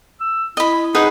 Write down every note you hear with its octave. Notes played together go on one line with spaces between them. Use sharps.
E6
E4 D#5 B5
D#4 G#4 B4 F#5